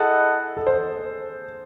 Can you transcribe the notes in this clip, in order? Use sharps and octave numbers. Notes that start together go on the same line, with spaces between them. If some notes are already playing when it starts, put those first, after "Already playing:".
Already playing: E4 G#4 A4 D#5 F#5
A4
C5